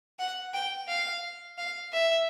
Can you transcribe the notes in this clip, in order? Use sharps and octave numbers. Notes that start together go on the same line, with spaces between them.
F#5
G5
F5
F5
E5